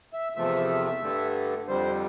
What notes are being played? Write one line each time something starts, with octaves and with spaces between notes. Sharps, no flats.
E5
E2 C3 F3 A3 E5
G2 D3 A3
F2 D3 G3 C5